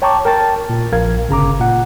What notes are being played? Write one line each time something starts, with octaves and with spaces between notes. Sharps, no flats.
C#5 G5 A5 A#5 C#6 D6
A#4 G5 A5 A6
A#2
A#1 A#4 F5 G#6
G1 C#3 A#5 D6
A#2 F#5